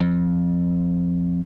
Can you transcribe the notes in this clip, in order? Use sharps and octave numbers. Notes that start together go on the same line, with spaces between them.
F2